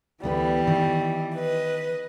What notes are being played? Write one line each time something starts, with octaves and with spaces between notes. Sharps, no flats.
D2 E3 G3 B3 B4
D#3
B4 D#5